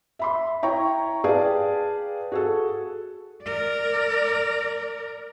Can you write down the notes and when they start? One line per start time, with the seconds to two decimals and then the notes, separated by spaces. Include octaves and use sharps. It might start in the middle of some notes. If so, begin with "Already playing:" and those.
0.19 E5 B5 C6
0.63 E4 C#5 G5 A#5 C#6
1.24 G#4 B4 D5 F5 G5 A5
2.32 F#4 G#4 A4
3.43 A#4 D5